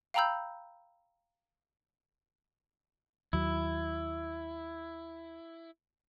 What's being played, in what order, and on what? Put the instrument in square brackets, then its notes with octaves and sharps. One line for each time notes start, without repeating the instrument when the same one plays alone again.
[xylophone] F5 G5 A#5 B5 E6 G6
[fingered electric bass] D#2 F#3 [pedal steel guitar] E4